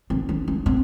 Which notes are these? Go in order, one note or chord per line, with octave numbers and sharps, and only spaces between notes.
C4
C#4
C#4
C4